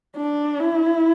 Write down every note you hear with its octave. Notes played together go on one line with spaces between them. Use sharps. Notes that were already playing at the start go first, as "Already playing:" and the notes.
D4
E4